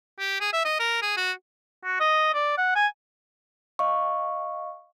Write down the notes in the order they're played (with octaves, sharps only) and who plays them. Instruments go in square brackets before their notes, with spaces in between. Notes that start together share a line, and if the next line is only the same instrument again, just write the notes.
[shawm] G4
G#4
E5
D#5
A#4
G#4
F#4
[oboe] F#4
D#5
D5
F#5
G#5
[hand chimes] D#5 F5 C#6